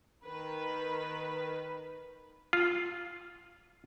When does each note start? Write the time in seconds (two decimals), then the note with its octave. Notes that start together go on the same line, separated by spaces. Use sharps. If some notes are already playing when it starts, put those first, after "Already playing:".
0.25 D#3 B4
2.53 F4